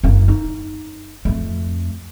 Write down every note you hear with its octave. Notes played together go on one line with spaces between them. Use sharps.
F#1 A#3
D#4
F2 A3